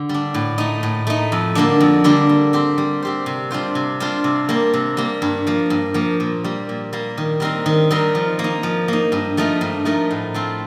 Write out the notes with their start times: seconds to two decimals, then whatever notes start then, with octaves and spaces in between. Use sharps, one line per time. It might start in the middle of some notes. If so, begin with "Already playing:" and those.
Already playing: D3
0.09 G3
0.14 D4
0.34 A2
0.58 A3 D#4
0.83 A2
1.07 A3 D#4
1.32 F2
1.55 D3 G3 A#3 D4
1.80 F2
2.04 D3 G3 A#3 D4
2.29 G3
2.53 C4 G4 C5
2.78 G3
3.02 C4 G4 C5
3.26 C3
3.51 G3 D4 F4 C5
3.75 C3
4.00 G3 D4 F4 C5
4.24 C3
4.49 G3 A#3
4.74 C3
4.97 G3 A#3
5.22 G2
5.47 F3 A#3
5.70 G2
5.94 F3 A#3
6.20 A#2
6.44 G3 A#3
6.69 A#2
6.93 G3 A#3
7.18 D#3
7.40 G3 C4 D#4 A#4
7.66 D#3
7.91 G3 C4 D#4 A#4
8.15 F3
8.39 A#3
8.44 D#4
8.63 F3
8.88 A#3 D#4
9.12 G2
9.37 F3 A3 D#4 A#4
9.61 G2
9.85 F3 A3 D#4 A#4
10.11 A2
10.34 A3 C4 F4